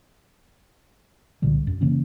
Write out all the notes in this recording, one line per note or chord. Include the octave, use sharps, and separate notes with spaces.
C2 A#2 D3 G3
F#2
C#3 E3 A#3 C#4